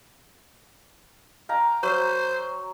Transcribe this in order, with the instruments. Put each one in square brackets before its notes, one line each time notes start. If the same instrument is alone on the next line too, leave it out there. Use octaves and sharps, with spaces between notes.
[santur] F5 G5 A#5
[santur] F#3 [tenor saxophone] C5